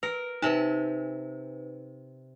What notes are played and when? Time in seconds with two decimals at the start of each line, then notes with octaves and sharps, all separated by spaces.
0.03 A#4 B4
0.42 C3 D#4 B4 A5